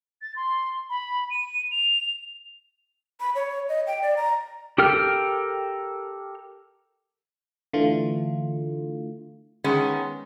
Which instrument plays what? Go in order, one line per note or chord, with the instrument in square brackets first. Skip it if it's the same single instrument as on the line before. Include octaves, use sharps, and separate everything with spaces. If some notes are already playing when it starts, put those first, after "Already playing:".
[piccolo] A6
C6
B5
D#7
F7
[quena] B5
C#5
D#5
G5
D5
A#5
[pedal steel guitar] G4 A4 A#4 G5 F6
[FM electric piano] D3 E3 A3 F4
[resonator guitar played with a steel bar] D#3 G#3 B3 C#4